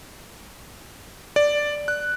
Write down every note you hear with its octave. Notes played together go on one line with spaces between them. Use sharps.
D5
F#6